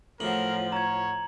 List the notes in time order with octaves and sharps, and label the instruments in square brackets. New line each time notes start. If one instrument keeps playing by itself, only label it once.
[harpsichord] A2 F#3 [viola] F3 [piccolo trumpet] A#4 [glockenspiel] F#7
[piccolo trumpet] C#5 [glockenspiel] A#5 G#6